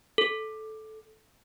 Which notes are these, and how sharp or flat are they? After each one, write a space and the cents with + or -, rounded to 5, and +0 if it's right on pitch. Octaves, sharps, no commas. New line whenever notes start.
A4 -10